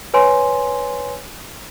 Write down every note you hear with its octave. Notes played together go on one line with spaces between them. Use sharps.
B4 C#5 G#5 C6